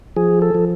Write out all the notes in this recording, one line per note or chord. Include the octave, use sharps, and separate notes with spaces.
F3 G#4
A4
F3